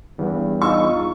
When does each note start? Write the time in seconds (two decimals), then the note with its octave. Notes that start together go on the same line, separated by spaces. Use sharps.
0.18 E2 G2
0.61 D#4 F4 C#6 E6